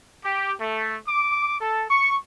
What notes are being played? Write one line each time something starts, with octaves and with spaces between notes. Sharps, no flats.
G4
A3
D6
A4
C#6